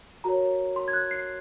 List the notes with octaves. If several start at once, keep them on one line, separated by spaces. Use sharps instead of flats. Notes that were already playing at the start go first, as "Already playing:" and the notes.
F#4 A#4 C#5 A#5
C6
G#6
F#6
C7